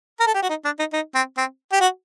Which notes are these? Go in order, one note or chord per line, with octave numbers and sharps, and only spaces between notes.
A#4
A4
G4
F#4
D#4
D4
D#4
D#4
C4
C4
G4
F#4